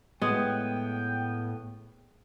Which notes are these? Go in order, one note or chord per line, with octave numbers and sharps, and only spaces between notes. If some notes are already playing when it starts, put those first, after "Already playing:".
A2 G#3 B3 G5